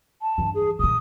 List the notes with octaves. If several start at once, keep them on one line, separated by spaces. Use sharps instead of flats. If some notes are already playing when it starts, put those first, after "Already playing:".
A5
G2 E3
G#4
A#2 D#3 D#6